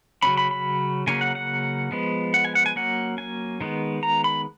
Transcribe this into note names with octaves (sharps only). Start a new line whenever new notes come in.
C#3 F#3 A#3 C#4 B5
B5
B5
C#3 F#3 A#3 C#4 G#5
F#5
F#5
F3 G#3 B3
F#5
G#5
F#5
G#5
F#3 A#3 C#4 F#5
G#5
D#3 G#3 B3
A#5
B5